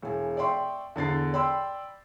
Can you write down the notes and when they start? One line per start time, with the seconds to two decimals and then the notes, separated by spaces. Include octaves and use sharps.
0.02 E1 G#5
0.37 D5 E5 G5 C6 C#6
0.96 E2 D3 A6 C7
1.33 D5 G5 B5 C6 E6